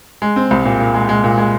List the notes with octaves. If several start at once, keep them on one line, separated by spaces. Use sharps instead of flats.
G#3
C4
C2
A#2
A#2
G#3
G#3
A#2
G#3